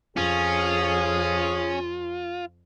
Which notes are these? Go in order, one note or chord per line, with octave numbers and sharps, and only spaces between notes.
F2 C#4 F4 G#4